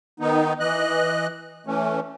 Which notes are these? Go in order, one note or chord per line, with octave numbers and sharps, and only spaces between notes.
D#3 B3 D#4
E3 D#5 F#6
E3 A3 C#4